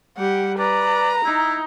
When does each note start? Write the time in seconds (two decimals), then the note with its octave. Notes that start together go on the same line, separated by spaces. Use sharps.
0.18 G3 G4 F#5
0.59 B4 D5 A#5
1.25 D#4 E4